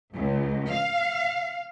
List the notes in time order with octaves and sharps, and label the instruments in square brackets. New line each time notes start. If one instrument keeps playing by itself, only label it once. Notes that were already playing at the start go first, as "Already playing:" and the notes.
[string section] C#2
F5